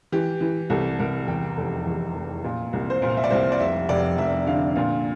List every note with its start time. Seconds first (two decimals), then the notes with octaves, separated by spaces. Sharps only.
0.12 E3 G4
0.41 E3
0.70 C2 A4
1.00 C2 A#4
1.28 E2 G5
1.57 F1 A4
1.87 E2
2.15 F1
2.44 A#2
2.73 C2
2.90 C5
3.02 A#2 A#4
3.10 F5
3.17 E5
3.24 D5
3.30 C2 C5
3.52 D5
3.60 F1 E5
3.89 F1 D5
4.18 F1 E5
4.47 D3 F5
4.76 A#2 F5